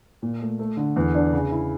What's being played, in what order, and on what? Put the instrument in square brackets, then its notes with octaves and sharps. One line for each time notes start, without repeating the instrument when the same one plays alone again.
[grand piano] A#2
A3
A3
D3
E2
D4
C#3
E4